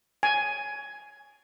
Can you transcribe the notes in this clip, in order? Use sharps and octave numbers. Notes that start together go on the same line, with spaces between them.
G#5